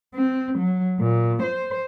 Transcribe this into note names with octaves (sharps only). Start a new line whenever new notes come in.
C4
F#3
A#2
C5